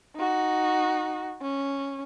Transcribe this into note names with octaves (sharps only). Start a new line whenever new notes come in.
D#4 F#4
C#4